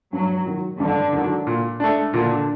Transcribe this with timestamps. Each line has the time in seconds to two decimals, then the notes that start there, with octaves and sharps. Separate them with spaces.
0.12 G2 F#3
0.46 D#3 F#3
0.79 G2 D3
1.13 D#3 F#3
1.47 A#2
1.80 A3 D4
2.13 A#2 D3